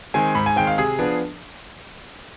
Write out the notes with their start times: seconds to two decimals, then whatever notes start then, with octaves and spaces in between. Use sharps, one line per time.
0.14 D#3 G#3 C4 G#5
0.35 G#2 B5
0.46 G#5
0.56 D#3 G#3 C4 G5
0.67 F5
0.78 C3 G#4
0.99 F3 B3 D4